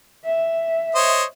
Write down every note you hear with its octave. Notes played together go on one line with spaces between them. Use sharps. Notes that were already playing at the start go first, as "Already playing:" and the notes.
E5
C5 C#5 D#5